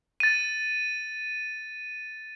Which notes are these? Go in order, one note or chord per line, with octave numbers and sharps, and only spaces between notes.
A6 D#7